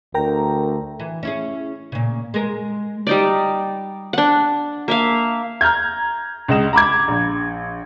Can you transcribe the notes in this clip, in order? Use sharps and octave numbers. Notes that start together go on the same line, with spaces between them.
D2 A#4 G5 A#5
E3
C#4 E4 G#4
A#2 C#3
G#3 A#4
G3 D#4 D5
D4 F#5
A#3 E5 F5
A#5 F6 G6 G#6
C#2 G#3 D#5 E7
A#5 B5 D6 G#6
A#1